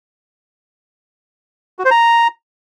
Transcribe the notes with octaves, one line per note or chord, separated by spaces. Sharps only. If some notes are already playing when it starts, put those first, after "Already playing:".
F#4
C5
A#5